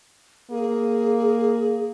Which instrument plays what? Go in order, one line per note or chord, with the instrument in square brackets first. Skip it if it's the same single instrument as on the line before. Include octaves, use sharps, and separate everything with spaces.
[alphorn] A#3 [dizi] G#4